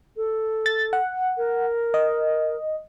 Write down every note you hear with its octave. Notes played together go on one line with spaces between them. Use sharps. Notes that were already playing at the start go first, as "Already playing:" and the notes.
A4
A6
F#5
A#4
D#5